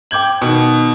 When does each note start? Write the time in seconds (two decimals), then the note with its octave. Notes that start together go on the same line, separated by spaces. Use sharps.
0.11 G5 D6 G6 G#6 F#7
0.42 B2 D#3